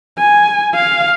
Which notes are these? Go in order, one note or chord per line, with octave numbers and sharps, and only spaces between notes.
G#5
F5